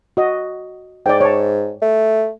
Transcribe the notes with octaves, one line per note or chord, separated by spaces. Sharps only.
F#4 D#5
G#2 D5 G5
C#5 A5
A3